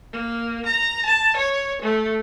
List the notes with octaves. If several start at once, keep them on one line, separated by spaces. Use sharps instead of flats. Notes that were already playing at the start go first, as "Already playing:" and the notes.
A#3
A#5
A5
C#5
A3